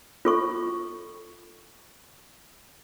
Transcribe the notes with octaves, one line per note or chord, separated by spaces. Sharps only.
F4 A4 C#6